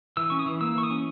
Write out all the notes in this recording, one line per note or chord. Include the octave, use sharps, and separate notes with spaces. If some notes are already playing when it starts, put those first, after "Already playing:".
E3 E6
C#4 C#6
D#6
E3
A#3 E6
E3 C#6
D#6
C#4